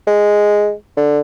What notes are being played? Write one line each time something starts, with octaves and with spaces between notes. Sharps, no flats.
G#3
D3